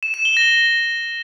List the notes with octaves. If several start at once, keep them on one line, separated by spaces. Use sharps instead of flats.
E7
E7
G7
A#6